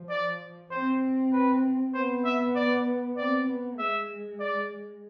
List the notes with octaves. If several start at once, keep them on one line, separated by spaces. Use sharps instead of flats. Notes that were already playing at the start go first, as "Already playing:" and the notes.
Already playing: F3
D5
C4 C5
B4
B3 C5
E5
D5
C4 D5
B3
G#3 E5
D5